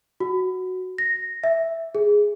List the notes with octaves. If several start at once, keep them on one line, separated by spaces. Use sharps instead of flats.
F#4
A#6
E5
G#4